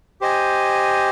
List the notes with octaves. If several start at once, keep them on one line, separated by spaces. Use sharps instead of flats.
G4 C5 D#5 G#5